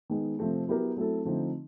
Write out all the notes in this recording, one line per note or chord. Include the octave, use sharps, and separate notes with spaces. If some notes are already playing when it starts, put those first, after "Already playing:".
D#3 G#3 B3
C3 F3 A3 C4
F#3 B3 E4 G4 A#4
F#3 A3 C4 E4 A4
D3 F3 A3 C4 D#4